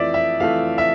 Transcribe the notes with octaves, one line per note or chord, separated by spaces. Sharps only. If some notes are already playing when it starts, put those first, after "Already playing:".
Already playing: F2 E3 A3 D5 E5
E5
F2 E3 A3 F5
E5